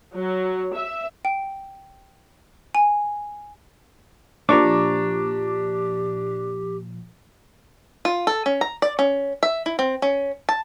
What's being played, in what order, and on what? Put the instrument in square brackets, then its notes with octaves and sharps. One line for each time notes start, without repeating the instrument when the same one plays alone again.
[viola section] F#3
E5
[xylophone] G5
G#5
[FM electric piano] A#2 F3 [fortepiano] D4 [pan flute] G4 [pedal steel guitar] A#5 C#6 D6
[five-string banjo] F4
A4
C#4
A#5
D5
C#4
E5
E4
C4
C#4
A5